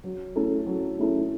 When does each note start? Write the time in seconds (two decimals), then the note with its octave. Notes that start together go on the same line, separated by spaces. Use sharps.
0.04 F#3
0.36 A3 C#4 E4 A4
0.66 F#3
0.99 A3 C#4 E4 A4